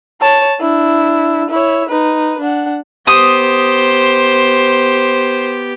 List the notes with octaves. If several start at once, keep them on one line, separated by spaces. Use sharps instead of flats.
C#5 A5
D4 E4
E4 C#5
D#4 B4
D4 F#5
B3 G4 C5 D#6